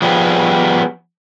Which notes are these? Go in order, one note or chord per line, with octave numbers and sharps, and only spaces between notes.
F3 G3 B3 G#4